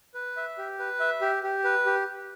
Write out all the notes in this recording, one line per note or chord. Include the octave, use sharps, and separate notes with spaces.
B4
E5
G4
B4
E5
G4
G4
B4
G4